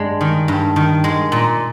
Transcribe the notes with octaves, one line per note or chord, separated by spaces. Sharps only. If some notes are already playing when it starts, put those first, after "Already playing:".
Already playing: G2 G#3 D5
D#3
G2
D#3
G#3
A#2